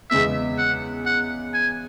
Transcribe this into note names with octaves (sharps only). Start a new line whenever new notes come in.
E2 C#3 G#3 B3 E5
F#5
F#5
G#5